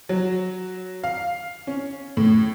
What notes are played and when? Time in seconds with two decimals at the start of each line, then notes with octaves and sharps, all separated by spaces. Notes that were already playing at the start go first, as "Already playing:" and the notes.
0.09 F#3
1.04 F5
1.67 C#4
2.17 A2